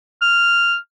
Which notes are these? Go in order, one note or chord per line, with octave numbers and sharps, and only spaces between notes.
F6